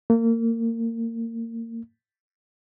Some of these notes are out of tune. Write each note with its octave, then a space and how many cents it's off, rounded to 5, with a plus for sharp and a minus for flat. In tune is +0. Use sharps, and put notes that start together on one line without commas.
A#3 -30